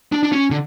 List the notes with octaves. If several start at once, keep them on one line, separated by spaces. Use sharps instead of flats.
D4
D4
C#4
D3